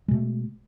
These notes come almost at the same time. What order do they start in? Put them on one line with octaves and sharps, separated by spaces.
G#3 B2 A3